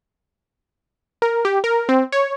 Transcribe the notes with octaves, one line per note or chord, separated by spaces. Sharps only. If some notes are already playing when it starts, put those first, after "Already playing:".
A#4
G4
A#4
C4
C#5